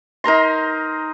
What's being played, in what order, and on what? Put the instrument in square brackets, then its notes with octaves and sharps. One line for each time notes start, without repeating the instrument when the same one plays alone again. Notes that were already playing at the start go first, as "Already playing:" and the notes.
[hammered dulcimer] D#4 A#4 A#5 C6